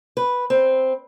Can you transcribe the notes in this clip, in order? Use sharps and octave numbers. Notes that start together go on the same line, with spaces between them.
B4
C4